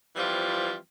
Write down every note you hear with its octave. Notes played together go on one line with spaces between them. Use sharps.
E3 F3 G3 C4 F4